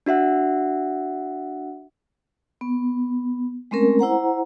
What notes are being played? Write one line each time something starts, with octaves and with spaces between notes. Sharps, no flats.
D4 F#4 E5 F#5
B3
G#3 A3 C4 C#4 A#4
E4 C5 F#5 A#5